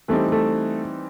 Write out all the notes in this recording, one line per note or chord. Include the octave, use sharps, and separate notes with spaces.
E3 G3 A3 C4 D#4
A3